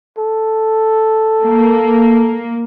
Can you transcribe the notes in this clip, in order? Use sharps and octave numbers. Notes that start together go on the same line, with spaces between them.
A4
A#3